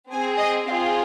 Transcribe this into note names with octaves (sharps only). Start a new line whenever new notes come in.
C4 G#4 G#5
D#5
C4 F4 G#4 F5